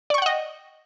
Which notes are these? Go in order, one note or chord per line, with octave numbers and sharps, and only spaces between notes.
D5 D#5 F#5 G5 C#6